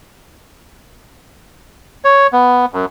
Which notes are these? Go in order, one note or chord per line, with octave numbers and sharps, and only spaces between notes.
C#5
B3
F#2